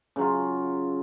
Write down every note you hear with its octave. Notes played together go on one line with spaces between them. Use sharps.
C#3 F#3 F4